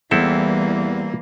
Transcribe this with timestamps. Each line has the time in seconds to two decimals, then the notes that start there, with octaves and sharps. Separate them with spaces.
0.11 E2 E3 G3 A#3 C4 E4 A4